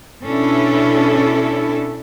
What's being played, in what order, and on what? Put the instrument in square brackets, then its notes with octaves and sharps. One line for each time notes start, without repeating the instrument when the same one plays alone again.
[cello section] B2 C#4 D4 E4 A4